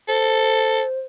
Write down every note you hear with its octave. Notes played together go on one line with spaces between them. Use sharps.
A4 C5